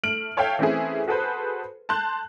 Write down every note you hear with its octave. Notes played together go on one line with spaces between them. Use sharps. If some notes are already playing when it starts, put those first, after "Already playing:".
A3 F6 D7 F#7
A4 C#5 E5 F5 G5
E3 A3 C4 C#4 E4 G#4
F#4 G#4 A4 B4 C5
A5 C6 F#6 G6